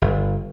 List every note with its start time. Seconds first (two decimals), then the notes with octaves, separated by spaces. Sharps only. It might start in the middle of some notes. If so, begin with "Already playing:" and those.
0.02 G1